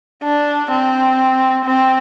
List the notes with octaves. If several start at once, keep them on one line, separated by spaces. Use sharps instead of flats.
D4
C4
C4